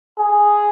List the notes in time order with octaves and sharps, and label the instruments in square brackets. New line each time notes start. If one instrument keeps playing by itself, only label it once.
[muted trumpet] G#4